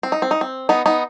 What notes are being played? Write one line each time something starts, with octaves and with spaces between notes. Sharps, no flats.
C4
D#4
C4
D#4
C4
B3 D#4
B3 D#4